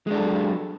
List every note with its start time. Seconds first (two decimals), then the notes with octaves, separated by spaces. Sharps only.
0.07 G#3
0.11 D4
0.15 A4
0.19 F#3